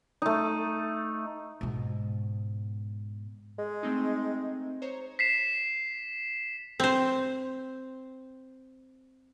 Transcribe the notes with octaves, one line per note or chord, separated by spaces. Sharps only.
A3 D#4
G#2 B2
G#3
A3 C4 D#4
C5 C#5 A#5
B6 C7 E7
C4 C5